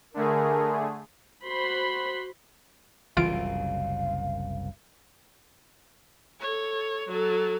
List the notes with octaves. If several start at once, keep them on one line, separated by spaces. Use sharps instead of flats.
D3 A3 G#4 A#4
F#4 C5 B5 C6
F#1 C2 C#3 E3 F4 F5 D7
A4 C#5
F#3 A4